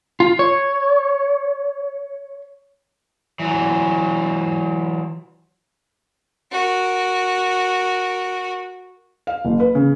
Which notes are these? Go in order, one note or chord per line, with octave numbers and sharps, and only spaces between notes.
F4
C#5
E3 F#3
F#4 A#4
F5
F#1
B4
C#3